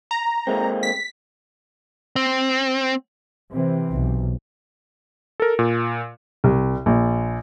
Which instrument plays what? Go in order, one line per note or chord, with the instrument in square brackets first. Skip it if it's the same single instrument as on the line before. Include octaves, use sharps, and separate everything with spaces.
[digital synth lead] A#5
[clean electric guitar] G#3 A#3 C4
[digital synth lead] B6
[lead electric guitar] C4
[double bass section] C3 E3 C4
[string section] B1
[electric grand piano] A4 A#4
A#2
[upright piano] C2
A#1